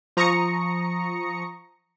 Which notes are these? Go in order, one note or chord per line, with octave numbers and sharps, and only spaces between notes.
F3 A#5 C#6 D#6 A#6 C#7